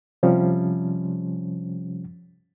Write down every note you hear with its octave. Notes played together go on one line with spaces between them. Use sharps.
C3 F3 G3 C#4